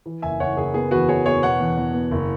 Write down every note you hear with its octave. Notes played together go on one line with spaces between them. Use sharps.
E3
F#1 E5 G#5
F#1 C#5 F#5
F#1 G#4
B3 G#4
E2 F#4 B4
E2 G#4 C#5
B3 G#4 C#5
B2 C#5 F#5
E2
E2
B3
F#1